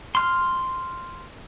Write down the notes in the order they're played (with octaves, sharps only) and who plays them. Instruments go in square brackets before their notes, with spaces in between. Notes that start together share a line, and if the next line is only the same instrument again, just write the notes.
[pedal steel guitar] C6 F6